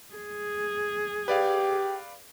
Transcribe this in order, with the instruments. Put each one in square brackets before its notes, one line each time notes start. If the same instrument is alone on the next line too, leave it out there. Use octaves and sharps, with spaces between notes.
[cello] G#4
[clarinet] G4 [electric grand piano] B4 D5 F5 [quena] G5